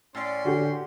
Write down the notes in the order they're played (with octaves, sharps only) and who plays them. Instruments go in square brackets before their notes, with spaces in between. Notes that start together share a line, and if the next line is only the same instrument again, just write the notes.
[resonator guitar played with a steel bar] A2 D5 [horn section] C#4 C6
[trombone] D3 [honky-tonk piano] F#4 G4